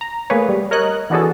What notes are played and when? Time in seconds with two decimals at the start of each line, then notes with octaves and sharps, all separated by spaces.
0.01 A#5
0.30 A3 A#3 G#4 B4 C#5
0.49 G3
0.71 A#4 C#5 D#5 F#6
1.10 E3 B3 D4 F#4 G#4 A4